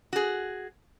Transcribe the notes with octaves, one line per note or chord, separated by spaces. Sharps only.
F#4 G#4